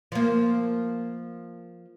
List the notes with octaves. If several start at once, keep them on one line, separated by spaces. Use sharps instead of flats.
F3 A#3